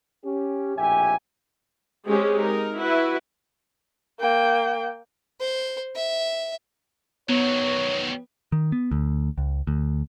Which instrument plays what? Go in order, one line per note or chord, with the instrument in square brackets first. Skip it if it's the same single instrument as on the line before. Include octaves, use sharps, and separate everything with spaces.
[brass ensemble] C#4 G4
A#1 F2 A2 G4 E5 G#5
[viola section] G#3 C4 C#4 G4 G#4
D#4 A#4
E4 F#4 B4
[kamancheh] A#3 G5
[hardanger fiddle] C5
E5
[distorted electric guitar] D#3 F#3 [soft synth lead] B3 [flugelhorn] C#5
[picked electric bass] D#3
B3
D2
C#2
D2